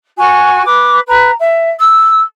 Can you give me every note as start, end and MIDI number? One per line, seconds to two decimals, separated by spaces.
0.17 0.62 66
0.17 0.62 80
0.17 0.62 85
0.65 0.99 71
0.65 0.99 86
1.06 1.31 71
1.06 1.31 82
1.38 1.71 76
1.78 2.20 88